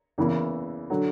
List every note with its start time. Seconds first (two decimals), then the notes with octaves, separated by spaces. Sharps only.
0.18 E2 C#3 E3 A#3
0.90 D3 F#3